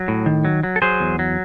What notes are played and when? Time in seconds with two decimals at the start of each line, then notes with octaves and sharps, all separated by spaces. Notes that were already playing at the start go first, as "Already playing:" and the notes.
Already playing: F#3
0.08 A2
0.26 D#3
0.45 F#3
0.63 F#3
0.76 A4
0.82 F#3 G#4 C5
1.00 E2
1.19 F#3